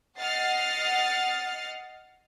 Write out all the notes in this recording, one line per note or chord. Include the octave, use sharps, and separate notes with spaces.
D#5 F#5 F6 A6 C7